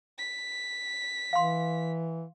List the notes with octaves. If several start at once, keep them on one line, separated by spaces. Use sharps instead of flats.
B6
E3 F5 C6